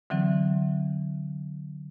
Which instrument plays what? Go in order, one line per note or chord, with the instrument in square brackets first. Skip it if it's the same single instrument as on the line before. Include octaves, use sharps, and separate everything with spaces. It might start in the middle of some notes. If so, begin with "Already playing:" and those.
[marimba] D3 E3 F#3 C4